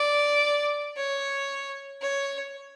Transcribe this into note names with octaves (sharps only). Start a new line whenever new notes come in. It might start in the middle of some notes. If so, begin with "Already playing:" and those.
Already playing: D5
C#5
C#5